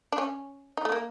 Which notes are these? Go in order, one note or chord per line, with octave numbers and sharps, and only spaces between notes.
D4
C#4
D#4
A3
A#3